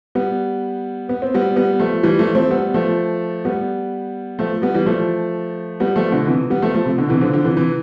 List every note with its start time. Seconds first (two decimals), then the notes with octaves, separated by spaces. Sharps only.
0.15 G3 B3
1.09 B3
1.22 C4
1.34 G3 B3
1.56 G3 B3
1.80 F3 A3
2.03 E3 G3
2.19 F3 A3
2.35 A3 C4
2.50 G3 B3
2.74 F3 A3
3.45 G3 B3
4.39 F3 A3
4.62 G3 B3
4.74 E3 G3
4.86 F3 A3
5.80 G3 B3
5.96 F3 A3
6.12 B2 D3
6.27 C3 E3
6.50 G3 B3
6.62 F3 A3
6.74 F3 A3
6.85 C3
6.98 B2 D3
7.10 C3 E3
7.21 D3 F3
7.33 D3 F3
7.44 C3 E3
7.57 C3 E3